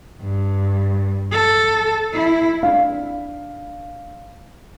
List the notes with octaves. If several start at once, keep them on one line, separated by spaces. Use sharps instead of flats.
G2
A4
E4
D4 F5